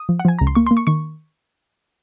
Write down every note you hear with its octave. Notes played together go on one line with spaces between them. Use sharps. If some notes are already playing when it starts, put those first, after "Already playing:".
Already playing: D#6
F3
F#5
F3 G#5
C#2 A#5
C6
A#3 C#6
C6
A#3
C#6
D#3 C#6